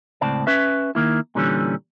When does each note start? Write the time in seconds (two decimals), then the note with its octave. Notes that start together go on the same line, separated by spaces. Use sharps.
0.21 C#2 A2 C4 D5 A5
0.47 C#4 B4 E5
0.95 D#3 A#3 E4
1.35 A#2 D3 E3 G3 C#4